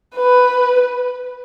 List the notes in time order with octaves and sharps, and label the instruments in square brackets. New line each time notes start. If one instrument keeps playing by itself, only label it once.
[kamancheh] B4